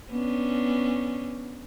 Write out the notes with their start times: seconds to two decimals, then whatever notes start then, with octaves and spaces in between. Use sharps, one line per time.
0.10 B3 C#4 D4